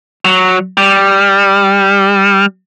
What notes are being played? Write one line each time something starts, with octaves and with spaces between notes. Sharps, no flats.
F#3
G3